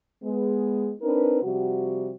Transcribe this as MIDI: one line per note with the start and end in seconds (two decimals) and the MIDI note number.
0.23 0.92 56
0.23 0.92 59
1.02 1.39 60
1.02 1.39 62
1.02 1.39 63
1.02 1.39 70
1.02 1.39 71
1.43 2.13 48
1.43 2.13 53
1.43 2.13 55
1.43 2.13 66